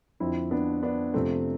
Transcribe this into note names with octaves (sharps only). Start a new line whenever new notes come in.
F2 D3 F3 C4 E4
B3 D4
B3 D4
F2 C3 F3 A3 C4